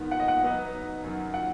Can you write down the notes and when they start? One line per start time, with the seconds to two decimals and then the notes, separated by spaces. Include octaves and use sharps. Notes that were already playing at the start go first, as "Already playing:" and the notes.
Already playing: G#2 D#3 B3
0.11 F#5
0.20 D#5
0.28 F#5
0.42 F#3 B3 D#4 B4 D#5
1.02 F#2 D#3 F#3
1.34 F#5